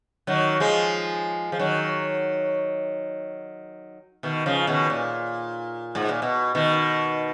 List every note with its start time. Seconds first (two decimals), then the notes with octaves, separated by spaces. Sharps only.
0.27 D#3 F#3
0.60 F3 G#3
1.52 F3
1.59 D#3 F#3
4.23 B2 D#3
4.46 C#3 F3
4.67 B2 D#3
4.90 A#2
5.95 G#2
6.09 A#2
6.22 B2
6.55 B2 D#3